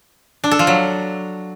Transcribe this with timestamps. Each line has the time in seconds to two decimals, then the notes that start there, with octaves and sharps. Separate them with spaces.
0.44 D4
0.51 A4
0.59 F3
0.67 F#3